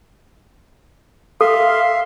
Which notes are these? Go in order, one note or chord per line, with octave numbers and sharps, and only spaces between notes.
A4 E5 F5 C6